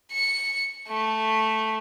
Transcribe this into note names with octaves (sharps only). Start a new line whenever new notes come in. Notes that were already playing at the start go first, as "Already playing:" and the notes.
C#7
A3